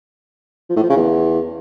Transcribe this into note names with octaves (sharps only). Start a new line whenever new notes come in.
F3
A2
F3
C#3
E2